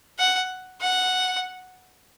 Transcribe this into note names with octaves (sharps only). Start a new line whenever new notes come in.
F#5
F#5